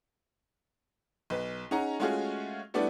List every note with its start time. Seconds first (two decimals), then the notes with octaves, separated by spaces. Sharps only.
1.30 B1 B4
1.71 C#4 D#4 G#4 F#5 A#5
2.00 G#3 A3 C#4 F4 F#4 G#4
2.74 G3 A3 B3 D4 E4 D5